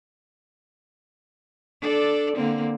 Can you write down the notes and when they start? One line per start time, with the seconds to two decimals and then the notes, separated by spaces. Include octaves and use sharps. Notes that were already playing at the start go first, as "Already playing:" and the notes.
1.81 D4 A4 D5
2.36 D3 A#3 C4